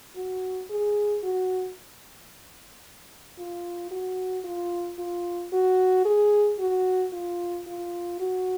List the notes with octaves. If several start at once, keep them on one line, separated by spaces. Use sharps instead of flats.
F#4
G#4
F#4
F4
F#4
F4
F4
F#4
G#4
F#4
F4
F4
F#4